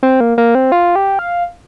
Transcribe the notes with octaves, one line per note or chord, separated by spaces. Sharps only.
C4
A#3
A#3
C4
F4
G4
F5